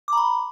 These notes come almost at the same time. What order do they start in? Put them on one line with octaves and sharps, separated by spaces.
D6 A#5 B5